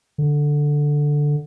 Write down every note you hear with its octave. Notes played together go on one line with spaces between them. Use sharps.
D3